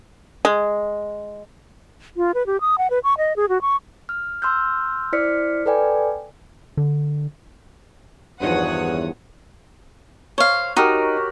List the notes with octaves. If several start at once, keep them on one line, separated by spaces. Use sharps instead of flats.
G#3
F4
B4
G4
D#6
F#5
B4
C#6
D#5
G#4
F#4
C#6
F6
C6 E6 F6 G6
E4 C5 D5 F6 B6 C#7
A4 B4 D5 G5 G#5
D3
E2 G2 D#3 F3 C#5 F#5 D#6
C5 C#5 F5
D#4 F#4 G4 A#4